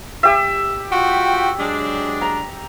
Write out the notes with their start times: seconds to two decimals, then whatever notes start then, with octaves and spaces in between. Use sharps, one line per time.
0.23 G4 E5
0.91 F4 F#4 G5
1.60 F#3 G#3 D4
2.21 A#5